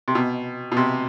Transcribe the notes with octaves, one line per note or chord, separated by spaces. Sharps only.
C3
B2
B2
C3